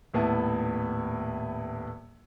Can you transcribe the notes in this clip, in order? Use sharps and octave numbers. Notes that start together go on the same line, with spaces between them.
D#1 A2 B3 E4 A5